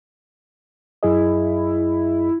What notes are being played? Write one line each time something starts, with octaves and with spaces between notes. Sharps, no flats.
F#2 E4 G#4 D#5